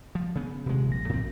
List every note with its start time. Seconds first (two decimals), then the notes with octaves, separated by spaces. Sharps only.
0.15 F3
0.35 C#3 B3
0.66 D#1 C3 G#3
0.89 A#1 A#6
1.09 A2 C4